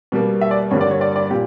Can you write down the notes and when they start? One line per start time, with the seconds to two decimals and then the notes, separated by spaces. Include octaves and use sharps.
0.12 B2 G3 A#3
0.41 E5
0.51 D5
0.71 G2 D3 G3 A#3 C#5
0.81 D5
0.91 C#5
1.01 D5
1.16 D5
1.30 A#2 G4